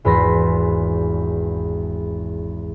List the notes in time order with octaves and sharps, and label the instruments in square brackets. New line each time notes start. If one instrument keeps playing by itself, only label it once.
[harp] G#1 E2 B4 B5 C6 A#6